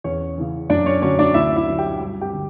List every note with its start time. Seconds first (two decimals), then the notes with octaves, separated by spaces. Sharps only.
0.04 E2 C#4 C#5
0.38 C#3 E3
0.70 F#2 D4 D5
0.86 C#4 C#5
1.02 D3 F#3 C#4 C#5
1.19 D4 D5
1.34 D2 E4 E5
1.56 E4 E5
1.67 D3 F#3
1.78 G4 G5
2.00 G2
2.21 G4 G5
2.33 D3